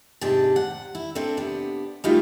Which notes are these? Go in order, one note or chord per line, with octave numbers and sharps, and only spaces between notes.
G#2 C3 D4 G5 A5
F#5
E4
C4 D4 A4 A#4
C3 B3 D4
G3 A3 B3 D#4 F4 F#4